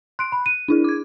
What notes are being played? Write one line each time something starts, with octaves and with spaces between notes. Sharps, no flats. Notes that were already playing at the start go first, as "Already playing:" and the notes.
C6 F#6 D7
B5
D#7
D4 E4 G#4
D6 G#6